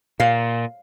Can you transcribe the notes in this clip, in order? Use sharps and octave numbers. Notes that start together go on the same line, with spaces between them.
A#2 F5